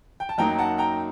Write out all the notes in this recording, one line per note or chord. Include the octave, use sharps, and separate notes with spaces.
G5
A5
F#2 F#3 A#3 D#4 G5 A#5
F#5 A5
G5 A#5